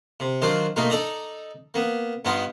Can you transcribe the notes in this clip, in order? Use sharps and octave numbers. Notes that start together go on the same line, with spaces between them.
C3
D#3 F#3 D4 F4 C5
B2 A3 A#3 D#4 F4
D#4 A4 D5 A#5
A#3 B3
G2 B3 D#4 F4 F#5